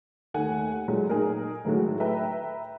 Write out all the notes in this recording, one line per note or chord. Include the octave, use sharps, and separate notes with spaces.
D#2 D#3 A3 F#5 G#5
A#2 F#3 G#3 A3
D#4 G#4 A#4
A2 D#3 F#3 G#3 A3 F#4
B4 E5 G5 A#5